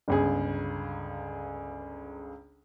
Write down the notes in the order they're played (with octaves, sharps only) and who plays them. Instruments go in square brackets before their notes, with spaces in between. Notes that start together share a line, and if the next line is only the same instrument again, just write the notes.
[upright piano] G1 C#2 G#4